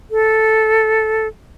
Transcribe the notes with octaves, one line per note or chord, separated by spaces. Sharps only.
A4